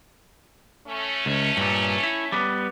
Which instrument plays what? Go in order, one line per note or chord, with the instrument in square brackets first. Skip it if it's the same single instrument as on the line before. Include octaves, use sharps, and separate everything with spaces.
[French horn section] A3 C#4
[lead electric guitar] C#2
G2 A#2
E4
G3 B3